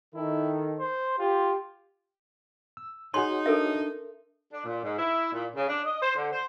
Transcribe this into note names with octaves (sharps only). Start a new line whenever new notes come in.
D#3 E4 A4
C5
F4 G4
E6
D#4 F#4 G#4 C#5 C6
D4 A4 A#4 E5
D4
A#2
G#2
E4
A#2
C#3
D4
D#5
C5
D3
C5